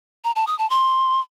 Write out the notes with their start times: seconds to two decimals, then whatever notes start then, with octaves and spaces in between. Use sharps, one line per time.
0.24 A#5
0.36 A5
0.47 D#6
0.59 A5
0.70 C6